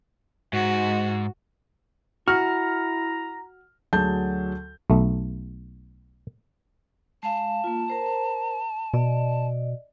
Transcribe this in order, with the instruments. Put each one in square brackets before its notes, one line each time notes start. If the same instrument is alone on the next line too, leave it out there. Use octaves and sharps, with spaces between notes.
[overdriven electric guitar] G#2 [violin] F#4
[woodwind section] E4 A#5 [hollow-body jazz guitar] F#4 [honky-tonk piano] F6
[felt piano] D2 F#3 G#4 A5 G6
[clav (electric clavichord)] B1 A3
[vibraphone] G#3 F5 [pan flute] A5
[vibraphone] A#3 F4
A#4 C5 A#5
[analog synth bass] B2 [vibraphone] D5 D#5